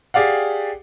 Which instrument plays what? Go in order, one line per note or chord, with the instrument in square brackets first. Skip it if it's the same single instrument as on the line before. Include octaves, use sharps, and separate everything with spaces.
[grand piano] G4 G#4 D5 F5 F#5